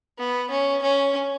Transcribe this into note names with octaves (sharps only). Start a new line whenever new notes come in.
B3
C#4
C#4